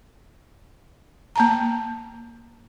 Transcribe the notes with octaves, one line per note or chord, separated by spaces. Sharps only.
A#3 A5 A#5